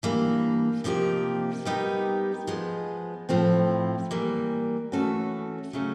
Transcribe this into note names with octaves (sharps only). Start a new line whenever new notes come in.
E3 G3 A#3 D4
C3 F3 A#3 D#4 G4
G3 B3 D#4 G4 A#4
F3 G#3 B3
A2 F3 A3 C4 E4
E3 G3 A#3
E3 A3 C#4 F#4 A4
C#3 F#3 A3 C#4